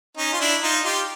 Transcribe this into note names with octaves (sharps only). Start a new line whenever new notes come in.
C#4 D#4
F4
D4 E4
D#4 F4
F4 G4